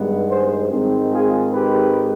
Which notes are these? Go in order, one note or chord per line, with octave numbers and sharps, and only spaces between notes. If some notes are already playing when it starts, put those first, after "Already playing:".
Already playing: G2 D#3 G#3 B3
G#4 C5
G#2 D#3 G#3 C4
F4 G#4
G4 B4